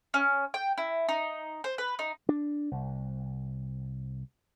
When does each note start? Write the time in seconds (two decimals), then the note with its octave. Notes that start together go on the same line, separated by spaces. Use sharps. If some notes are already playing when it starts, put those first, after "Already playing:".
0.14 C#4
0.54 G5
0.78 E4
1.09 D#4
1.64 C5
1.78 B4
1.99 D#4
2.29 D4
2.71 C2